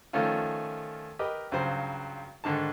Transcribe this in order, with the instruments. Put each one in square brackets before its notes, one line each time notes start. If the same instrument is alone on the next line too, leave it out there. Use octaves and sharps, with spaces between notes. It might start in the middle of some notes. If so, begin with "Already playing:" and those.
[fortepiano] D#3 F3 A3 C#4 F4
G4 A#4 B4 D#5
C#2 G2 C#3 F#3 C5
G#2 D3 D#3 A5